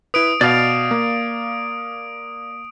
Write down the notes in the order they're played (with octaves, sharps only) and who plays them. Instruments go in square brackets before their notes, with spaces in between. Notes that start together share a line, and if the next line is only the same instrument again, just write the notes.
[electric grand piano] E4 B4 [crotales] D#6 D7
[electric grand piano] B2 [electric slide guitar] D5 F5
[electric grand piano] A#3